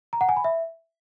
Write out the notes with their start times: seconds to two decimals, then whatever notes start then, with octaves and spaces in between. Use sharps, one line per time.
0.13 A#5
0.21 F#5
0.29 G#5
0.37 B5
0.44 E5